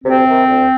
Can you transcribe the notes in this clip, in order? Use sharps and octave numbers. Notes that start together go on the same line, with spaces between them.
D2 C3 C4
C3 D#3
D2